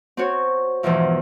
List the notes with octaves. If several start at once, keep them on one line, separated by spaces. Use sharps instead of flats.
C4 F#4 C#5
E2 G#2 B2 E3 F3